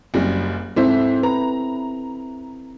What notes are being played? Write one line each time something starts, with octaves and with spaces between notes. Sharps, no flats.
F#1 F#2 G3
G#2 C4 E4 A4 C5 E5
B4 A#5